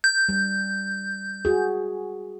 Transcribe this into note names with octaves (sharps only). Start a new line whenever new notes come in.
G6
G3
F#4 G#4